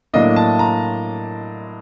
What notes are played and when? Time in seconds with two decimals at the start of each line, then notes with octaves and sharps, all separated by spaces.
0.13 A2 F#3 A#3 D4 D#5
0.36 A5
0.59 A#5